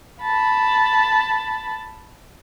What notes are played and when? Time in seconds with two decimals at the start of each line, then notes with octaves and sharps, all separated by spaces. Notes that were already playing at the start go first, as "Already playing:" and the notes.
0.22 A5 B5